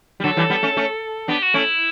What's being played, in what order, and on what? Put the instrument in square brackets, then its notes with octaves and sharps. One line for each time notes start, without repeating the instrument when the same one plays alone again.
[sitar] G3
[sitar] D3 F#3 [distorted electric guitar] A4
[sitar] E3 G3
G3 B3
A3 C#4
A3 C#4
[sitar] B3 D4 [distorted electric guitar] G4
[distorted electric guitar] F#4
[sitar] A3 C#4 [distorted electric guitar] E4